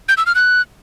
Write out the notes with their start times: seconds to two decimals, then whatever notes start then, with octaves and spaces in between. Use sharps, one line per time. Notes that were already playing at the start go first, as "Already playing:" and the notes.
0.09 G6
0.17 E6
0.26 F6
0.35 F#6